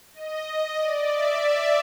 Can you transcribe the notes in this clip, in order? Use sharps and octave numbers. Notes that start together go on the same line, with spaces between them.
D#5
D#5
D5
E5